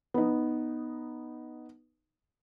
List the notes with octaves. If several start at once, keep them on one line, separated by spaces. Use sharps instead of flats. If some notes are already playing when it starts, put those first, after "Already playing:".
B3 D#4